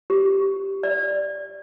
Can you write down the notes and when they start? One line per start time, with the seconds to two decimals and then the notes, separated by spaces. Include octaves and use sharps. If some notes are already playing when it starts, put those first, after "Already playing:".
0.10 G4
0.83 D5